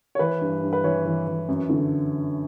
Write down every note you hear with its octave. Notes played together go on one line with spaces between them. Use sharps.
C#5
E3 B4
G2
G2
B4
E3 C#5
E3
E3
F#2
D3